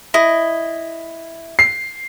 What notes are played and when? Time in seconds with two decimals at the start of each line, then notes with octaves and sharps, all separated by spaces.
0.14 E4 D#5
1.59 C7